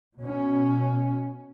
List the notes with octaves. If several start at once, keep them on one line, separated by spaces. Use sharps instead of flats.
B2 C#4